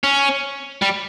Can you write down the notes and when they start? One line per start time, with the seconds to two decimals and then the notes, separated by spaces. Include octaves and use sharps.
0.04 C#4
0.82 G3